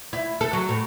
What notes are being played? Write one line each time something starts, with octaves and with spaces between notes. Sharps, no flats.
E4
A4
F#3
A2